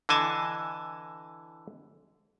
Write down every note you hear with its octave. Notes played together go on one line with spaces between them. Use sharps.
D3 E3 D#5 G#5 A5